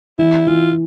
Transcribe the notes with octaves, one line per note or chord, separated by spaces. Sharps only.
E3 E4
E3 F4